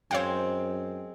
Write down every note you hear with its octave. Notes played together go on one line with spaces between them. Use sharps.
F#2 G#3 C4 C#5 F5 G5